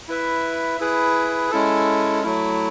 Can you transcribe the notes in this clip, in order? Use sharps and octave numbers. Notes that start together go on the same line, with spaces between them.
E4 B4 E5
E4 G#4 B4
G#3 C#4 E4 A4
F#3 A3 E4